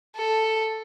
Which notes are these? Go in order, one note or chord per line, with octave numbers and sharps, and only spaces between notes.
A4